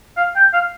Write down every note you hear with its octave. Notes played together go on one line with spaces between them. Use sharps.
F5
G5
F5